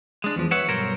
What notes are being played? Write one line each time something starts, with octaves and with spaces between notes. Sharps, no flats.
G#3 D4
E2 F3
B4 C#5 E5 F#5
B1 G2 A#4 C5 C#5